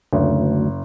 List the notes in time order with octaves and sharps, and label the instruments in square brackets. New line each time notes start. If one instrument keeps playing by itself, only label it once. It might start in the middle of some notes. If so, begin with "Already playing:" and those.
[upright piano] F#1 [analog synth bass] D2